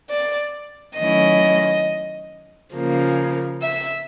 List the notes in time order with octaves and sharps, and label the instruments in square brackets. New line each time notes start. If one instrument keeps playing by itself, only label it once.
[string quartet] D5
D#3 F#3 A3 C#4 E4 D#5
C#3 F3 A#3
E5